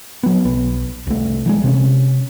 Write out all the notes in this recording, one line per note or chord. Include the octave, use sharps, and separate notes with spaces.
F#3 B3
B1 B3
C2 A3
E3 F#3 G#3
C3 C4 C#4